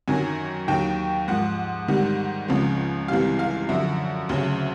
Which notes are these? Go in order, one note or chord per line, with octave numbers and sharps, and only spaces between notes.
F#2 D#3 F#3 G#5
D#2 D#3 F#3 G5
G#2 F3 F#5
G#2 D#3 G3 F#5
C#2 C#3 F3
C#2 C3 E3 G3 F5
F5
F#2 D3 F3 E5
D2 C#3 F#3